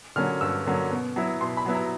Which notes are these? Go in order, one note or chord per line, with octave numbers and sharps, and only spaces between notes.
D3 F#3 A#3 C#4 F6
G2 E6
D3 F#3 A#3 C#4
B2
F#3 B3 E4
B2 C6
B5
F#3 B3 E4
A#5